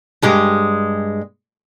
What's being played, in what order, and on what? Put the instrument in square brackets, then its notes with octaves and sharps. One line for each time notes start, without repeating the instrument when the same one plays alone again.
[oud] G2 G#3 G4